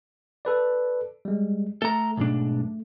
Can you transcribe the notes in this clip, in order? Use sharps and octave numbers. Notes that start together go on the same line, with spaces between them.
A4 B4 D5
G3 G#3
A3 A4 A#5
B1 G#2 D4